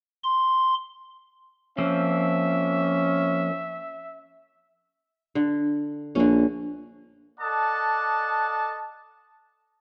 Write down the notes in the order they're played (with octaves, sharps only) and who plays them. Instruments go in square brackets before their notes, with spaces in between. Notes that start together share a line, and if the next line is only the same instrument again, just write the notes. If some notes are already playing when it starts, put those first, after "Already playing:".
[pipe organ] C6
[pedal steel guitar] F3 A#3 C4 [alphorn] C#4 [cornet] E5
[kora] D3
[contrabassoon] A#1 [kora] D3 C#4
[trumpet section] A4 D5 D#5 F#5 A5